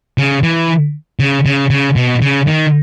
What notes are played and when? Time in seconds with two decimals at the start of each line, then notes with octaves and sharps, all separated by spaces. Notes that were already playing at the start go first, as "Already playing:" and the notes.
0.18 C#3
0.43 E3
1.20 C#3
1.46 C#3
1.70 C#3
1.96 B2
2.22 C#3
2.47 D#3